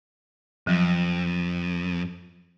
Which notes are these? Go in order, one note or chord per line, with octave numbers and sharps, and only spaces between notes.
F2 F3 F#3